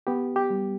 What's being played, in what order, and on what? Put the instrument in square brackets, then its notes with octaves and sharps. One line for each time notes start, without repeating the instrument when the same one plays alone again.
[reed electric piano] B3 G4
G4
G3